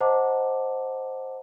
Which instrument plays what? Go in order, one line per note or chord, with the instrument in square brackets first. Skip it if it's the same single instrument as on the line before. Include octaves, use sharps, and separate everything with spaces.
[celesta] C5 D#5 F#5 A5 A#5 D6